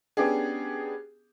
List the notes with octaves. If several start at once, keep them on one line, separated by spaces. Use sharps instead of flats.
B3 C#4 D4 G4 G#4